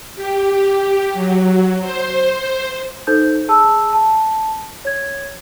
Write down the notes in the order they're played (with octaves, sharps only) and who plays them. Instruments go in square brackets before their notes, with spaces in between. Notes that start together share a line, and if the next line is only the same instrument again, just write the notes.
[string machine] G4
F#3
C5
[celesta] D#4 A4 C5 G6
G#4 A5 E6
A5
C#5 G#6